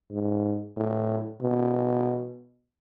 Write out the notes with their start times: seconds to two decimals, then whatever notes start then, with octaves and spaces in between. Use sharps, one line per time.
0.11 G#2
0.77 A2
1.41 B2